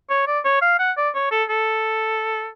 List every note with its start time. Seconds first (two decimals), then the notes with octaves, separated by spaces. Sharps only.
0.10 C#5
0.27 D5
0.44 C#5
0.62 F5
0.79 F#5
0.97 D5
1.15 C#5
1.31 A4
1.49 A4